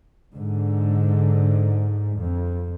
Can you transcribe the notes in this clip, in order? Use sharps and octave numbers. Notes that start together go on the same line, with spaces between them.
G#2 D3
F2